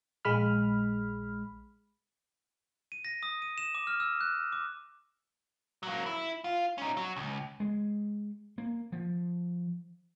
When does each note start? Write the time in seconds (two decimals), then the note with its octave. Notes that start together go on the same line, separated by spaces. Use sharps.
0.25 A#1 G#3 B5 F6
2.92 D#7
3.05 A#6
3.23 D#6
3.42 D#7
3.58 E7
3.75 D6
3.87 F6
4.00 E6
4.21 F#6
4.52 D6
5.83 F#3 A#3
6.06 E4
6.44 F4
6.78 C#4 D#4
6.97 F#3
7.16 C#2
7.60 G#3
8.58 A#3
8.92 F3